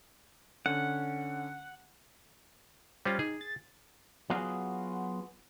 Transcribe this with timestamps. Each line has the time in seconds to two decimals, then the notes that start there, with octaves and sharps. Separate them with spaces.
0.66 D3 C#4 F#5
3.05 G3 C#4 F4 C5
3.19 D#4 G#4
3.41 A6
4.30 F#3 B3 F4 F#4 G#4